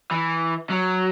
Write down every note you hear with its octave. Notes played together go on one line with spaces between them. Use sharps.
E3
F#3